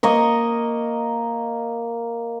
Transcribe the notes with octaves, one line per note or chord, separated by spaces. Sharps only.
A#3 D#5 C#6